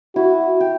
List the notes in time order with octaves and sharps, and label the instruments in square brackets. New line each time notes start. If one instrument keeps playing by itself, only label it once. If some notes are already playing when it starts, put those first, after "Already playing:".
[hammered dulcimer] E4 [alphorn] F#4
[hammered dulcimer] G4